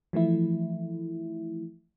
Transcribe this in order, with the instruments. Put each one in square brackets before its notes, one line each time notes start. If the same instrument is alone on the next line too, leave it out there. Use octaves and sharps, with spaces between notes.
[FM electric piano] E3 F3 A3 E4